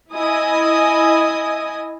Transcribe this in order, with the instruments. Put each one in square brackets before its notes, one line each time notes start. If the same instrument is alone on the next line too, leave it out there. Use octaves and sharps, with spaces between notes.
[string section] E4 D#5 G#5 D#6